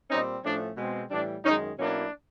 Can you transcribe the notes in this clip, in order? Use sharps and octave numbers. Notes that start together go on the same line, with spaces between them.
A#2 G3 C4 C#4 D#4
A2 F3 A3 C#4 D4
B2 G#3 C4
A2 E3 G3 D4
F#2 D#3 G#3 C#4 D#4
B2 F#3 A#3 C#4 D4 E4